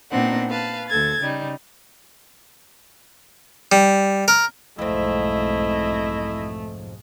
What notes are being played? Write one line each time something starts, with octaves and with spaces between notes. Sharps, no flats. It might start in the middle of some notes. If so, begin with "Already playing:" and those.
A#2 B3 C4 D4 D#4 F#5
B4 F5 A5
D2 A4 G#6 A6
C#3 G3 D#4
G3
A#4
B1 F2 G#2 G#3 A3 C4 E4 D#5